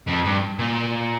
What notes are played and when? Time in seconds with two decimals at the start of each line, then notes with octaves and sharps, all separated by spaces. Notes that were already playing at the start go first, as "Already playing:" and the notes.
0.07 F2
0.24 G2
0.59 A#2